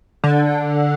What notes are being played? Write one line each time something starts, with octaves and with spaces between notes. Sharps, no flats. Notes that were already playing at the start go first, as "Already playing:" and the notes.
D3